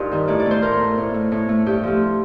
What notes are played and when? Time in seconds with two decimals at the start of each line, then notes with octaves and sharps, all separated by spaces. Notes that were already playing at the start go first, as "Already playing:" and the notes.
Already playing: G2 D#4 F4 A#4 C5 D#5
0.11 D#3 G3
0.28 A2 D5
0.40 D5
0.46 A3 C5
0.62 A2 A#4
0.80 A3
0.98 A2
1.14 A3
1.32 A2
1.49 A3
1.66 G2 G4
1.83 F3 A3